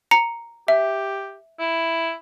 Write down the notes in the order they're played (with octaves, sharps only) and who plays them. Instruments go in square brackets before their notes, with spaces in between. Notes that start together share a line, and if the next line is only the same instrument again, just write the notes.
[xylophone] A#5 C#7
[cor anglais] G4 [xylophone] E5
[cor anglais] E4